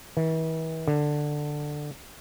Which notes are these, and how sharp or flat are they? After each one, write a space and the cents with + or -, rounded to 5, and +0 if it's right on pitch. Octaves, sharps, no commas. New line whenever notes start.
E3 -40
D3 +10